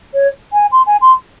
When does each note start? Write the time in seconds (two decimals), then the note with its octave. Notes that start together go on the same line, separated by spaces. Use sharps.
0.14 C#5
0.53 G#5
0.72 C6
0.86 G#5
1.01 C6